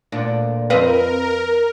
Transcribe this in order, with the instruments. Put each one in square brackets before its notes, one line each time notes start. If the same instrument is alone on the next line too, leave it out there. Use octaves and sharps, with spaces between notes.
[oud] D2 A#2 D4
[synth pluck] F2 C4 F5 [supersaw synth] A#4 [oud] B4 D#5